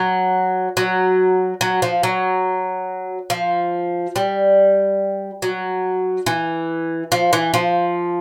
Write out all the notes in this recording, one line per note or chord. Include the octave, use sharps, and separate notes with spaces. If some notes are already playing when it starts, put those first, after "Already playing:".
Already playing: F#3
F#3
F#3
F3
F#3
F3
G3
F#3
E3
F3
E3
F3